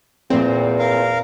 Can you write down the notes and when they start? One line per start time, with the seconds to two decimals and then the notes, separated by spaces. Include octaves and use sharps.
0.30 E2 A#2 C4
0.79 A#4 F5